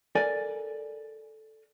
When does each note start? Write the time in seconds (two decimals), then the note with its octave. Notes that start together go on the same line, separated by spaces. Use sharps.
0.15 A4 A#4 D5 G#5